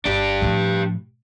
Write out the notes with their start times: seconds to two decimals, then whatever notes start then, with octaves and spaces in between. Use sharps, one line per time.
0.05 G1 D4 G4
0.42 A2 F3